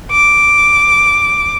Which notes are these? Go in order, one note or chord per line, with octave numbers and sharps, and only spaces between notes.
D6